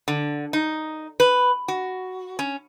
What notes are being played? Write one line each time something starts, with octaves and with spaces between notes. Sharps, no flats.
D3
D#4
B4
F#4
C#4